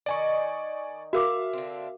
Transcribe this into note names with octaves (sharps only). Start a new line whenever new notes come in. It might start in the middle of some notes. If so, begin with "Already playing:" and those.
D#3 D5 D#5 G#5 C#6
F#4 A#4 E5 F5 D6
D3 C4